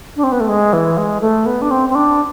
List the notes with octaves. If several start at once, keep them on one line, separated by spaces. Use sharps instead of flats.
D4
C4
B3
A3
G#3
E3
G#3
A3
B3
D4
C4
C4
D4